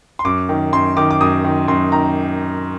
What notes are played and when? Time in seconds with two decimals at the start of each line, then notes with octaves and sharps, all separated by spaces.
0.19 C6
0.25 F#2 D6
0.49 D#3
0.73 F#2 C6
0.97 D#3 D6
1.11 D6
1.21 F#2 D#6
1.44 D#3
1.68 F#2 C6
1.92 D#3 A#5